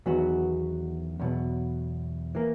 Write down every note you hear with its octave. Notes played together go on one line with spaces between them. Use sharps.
E2 D#3 F#3 B3 F#4
E2 B2 F#3
E3 A#3